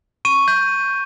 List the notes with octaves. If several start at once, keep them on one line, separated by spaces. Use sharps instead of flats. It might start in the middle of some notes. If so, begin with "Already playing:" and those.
C#6 D#7
G6